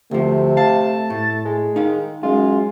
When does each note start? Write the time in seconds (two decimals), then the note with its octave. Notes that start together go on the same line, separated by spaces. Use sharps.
0.11 D2 C3 F3 A3
0.57 F5 A5
1.10 A2
1.45 G#3
1.76 D#3 D#4 F5
2.23 F#2 G#3 F4